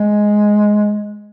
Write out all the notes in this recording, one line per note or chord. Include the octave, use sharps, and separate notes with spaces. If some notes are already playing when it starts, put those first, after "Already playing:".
Already playing: G#3